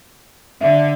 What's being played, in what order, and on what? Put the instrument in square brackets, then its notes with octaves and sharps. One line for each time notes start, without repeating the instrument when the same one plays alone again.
[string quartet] D3 [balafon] E5